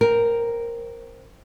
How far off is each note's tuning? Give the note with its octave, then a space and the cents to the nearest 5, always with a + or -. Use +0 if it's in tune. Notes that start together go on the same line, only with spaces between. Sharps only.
C4 +0 A#4 +0